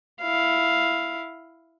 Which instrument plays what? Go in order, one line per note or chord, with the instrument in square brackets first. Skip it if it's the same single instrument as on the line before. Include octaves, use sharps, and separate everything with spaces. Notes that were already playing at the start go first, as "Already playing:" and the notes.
[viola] E4 F5